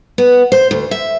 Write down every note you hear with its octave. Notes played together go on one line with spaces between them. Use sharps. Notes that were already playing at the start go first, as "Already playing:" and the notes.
B3
C5
D2
E5